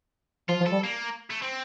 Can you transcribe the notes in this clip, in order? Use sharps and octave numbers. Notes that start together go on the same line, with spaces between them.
F3 F4
F3
A4
G3
A#3
A3
C4